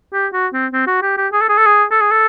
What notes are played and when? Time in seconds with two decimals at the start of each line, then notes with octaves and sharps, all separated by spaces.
0.13 G4
0.33 F#4
0.53 C4
0.73 C4
0.87 F#4
1.02 G4
1.17 G4
1.33 G#4
1.41 A4
1.49 G#4
1.58 A4
1.66 G#4
1.91 A4
2.01 G#4
2.11 A4